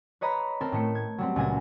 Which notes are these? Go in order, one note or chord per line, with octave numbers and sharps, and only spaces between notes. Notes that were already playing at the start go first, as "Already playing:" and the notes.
B4 C#5 D#5 A#5 B5 C#6
C4 A4 A#4
A2 A3 C#7
G#6
F#3 G3 C4
C#2 A#2 G#5 A#6